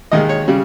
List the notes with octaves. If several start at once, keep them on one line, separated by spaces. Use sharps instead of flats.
D#2 D#3 G#3 D#5
C#5
C#3 G3